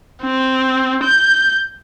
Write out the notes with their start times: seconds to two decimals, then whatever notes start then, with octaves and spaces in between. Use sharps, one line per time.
0.23 C4
1.03 G6